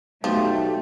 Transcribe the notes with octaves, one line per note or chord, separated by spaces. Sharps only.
B1 F3 A3 G4